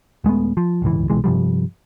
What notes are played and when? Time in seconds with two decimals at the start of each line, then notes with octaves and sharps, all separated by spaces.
0.24 D#1 G#3 A3 B3
0.57 F3
0.82 D1 G1 C#2 E3
1.10 C2 B2 E3 G#3
1.24 G2 C3 F3 G3